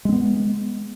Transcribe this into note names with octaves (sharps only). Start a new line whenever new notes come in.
G#3 B3 C4